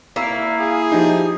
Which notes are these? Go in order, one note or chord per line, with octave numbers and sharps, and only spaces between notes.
A#3 E4 F5
G#4
F3 D#4 G4